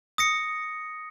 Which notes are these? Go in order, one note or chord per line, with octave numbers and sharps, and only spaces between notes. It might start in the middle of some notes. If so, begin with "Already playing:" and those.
D#6 A#6 C#7